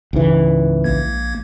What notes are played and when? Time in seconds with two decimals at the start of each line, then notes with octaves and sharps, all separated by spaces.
0.13 C#2 G#2 E3
0.84 A#1 A#3 G#6